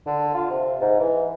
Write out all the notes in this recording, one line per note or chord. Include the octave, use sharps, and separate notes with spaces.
D3
F4
C3
G#2
E3